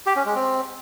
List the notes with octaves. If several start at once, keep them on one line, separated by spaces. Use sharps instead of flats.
G4
C#4
G#3
C4